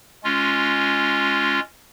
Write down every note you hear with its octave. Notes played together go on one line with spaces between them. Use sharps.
G#3 C#4 F4